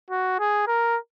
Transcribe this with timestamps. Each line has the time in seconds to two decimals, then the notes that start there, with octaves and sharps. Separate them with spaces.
0.10 F#4
0.39 G#4
0.67 A#4